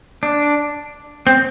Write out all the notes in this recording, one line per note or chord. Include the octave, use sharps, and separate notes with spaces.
D4
C4